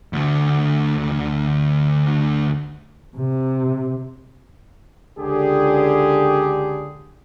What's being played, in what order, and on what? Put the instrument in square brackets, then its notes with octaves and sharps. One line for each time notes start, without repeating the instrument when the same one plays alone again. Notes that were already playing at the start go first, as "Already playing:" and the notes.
[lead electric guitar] D2 D3
[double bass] C3
[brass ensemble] C#2 D3 G4 G#4